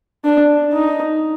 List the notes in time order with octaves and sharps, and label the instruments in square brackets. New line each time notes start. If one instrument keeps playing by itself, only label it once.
[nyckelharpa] D4
D#4